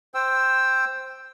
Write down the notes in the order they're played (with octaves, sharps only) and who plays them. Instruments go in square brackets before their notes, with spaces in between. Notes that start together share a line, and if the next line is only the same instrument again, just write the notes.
[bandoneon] C5 G5 E6